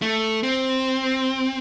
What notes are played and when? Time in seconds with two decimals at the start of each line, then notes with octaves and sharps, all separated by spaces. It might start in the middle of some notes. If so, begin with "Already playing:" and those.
0.02 A3
0.43 C4